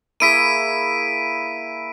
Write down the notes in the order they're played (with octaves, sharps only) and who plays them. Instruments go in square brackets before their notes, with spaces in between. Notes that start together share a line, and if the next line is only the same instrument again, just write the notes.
[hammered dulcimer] A#3 E4 G#4 [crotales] B6 D7 D#7